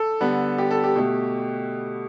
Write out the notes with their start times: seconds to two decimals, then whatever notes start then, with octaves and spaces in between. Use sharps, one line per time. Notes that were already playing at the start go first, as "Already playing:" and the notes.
Already playing: A4
0.20 D3 G3 B3
0.58 G4
0.71 A4
0.84 G4
0.96 B2 A3